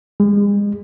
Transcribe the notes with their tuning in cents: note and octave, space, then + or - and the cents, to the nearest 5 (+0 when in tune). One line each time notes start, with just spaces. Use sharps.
G#3 -35